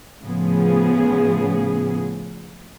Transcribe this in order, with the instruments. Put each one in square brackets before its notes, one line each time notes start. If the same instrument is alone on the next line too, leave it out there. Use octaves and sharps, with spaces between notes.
[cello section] A2 C#3 F3 B3 G#4